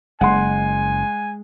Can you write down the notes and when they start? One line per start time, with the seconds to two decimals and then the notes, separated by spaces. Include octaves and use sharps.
0.21 F#1 G#3 F#5 G#5 C6